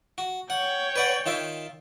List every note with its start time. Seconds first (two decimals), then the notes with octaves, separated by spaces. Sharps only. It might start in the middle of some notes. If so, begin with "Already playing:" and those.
0.18 F#4
0.50 C#5 F#5 G5
0.96 B4 D5 F#5
1.26 D#3 F4 E5